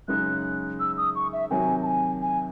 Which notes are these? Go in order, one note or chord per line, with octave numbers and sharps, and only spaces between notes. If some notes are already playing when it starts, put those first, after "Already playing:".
F#2 C#3 G#3 D#4 F#6
E6
D#6
C#6
E5
C3 D#3 F#3 G#5
A5
G#5
G#5